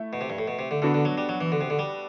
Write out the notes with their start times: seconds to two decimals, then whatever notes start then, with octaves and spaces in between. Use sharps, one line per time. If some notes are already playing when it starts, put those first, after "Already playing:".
Already playing: A3 E4
0.13 B2
0.21 C3
0.30 G2
0.38 A2
0.47 B2
0.59 C3
0.71 D3
0.82 D3 B3 D4 F#4 A4
0.94 D3
1.05 F#3
1.18 G3
1.29 F#3
1.41 E3
1.52 D3
1.61 C3
1.70 D3
1.79 G3